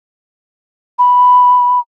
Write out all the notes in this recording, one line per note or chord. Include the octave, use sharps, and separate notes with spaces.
B5